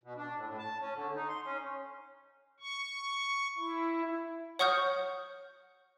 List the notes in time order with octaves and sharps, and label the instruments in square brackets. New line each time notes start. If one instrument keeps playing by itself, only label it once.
[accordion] B2
D4
A2
A2
A5
C#4
D3
D#4
C6
C#4
[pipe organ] C#6
E4
[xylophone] C#5 F#5 C#6 D#6 F6 G6